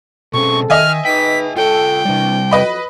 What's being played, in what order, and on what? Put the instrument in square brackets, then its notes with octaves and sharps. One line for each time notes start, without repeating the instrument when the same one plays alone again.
[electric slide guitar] B2 C#4 [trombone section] G#3 C4 A4 [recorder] C#6
[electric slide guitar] D#3 [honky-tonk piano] D#5 E5 G#5 [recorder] F6
[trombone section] D#4 B4 [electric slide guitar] G#4 G5 [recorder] B6
[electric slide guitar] F4 C#5 [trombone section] A4 [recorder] G5
[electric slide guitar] C3 G3 [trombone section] E3 C4 D4
[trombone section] F2 F#3 [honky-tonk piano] B4 D#5 B5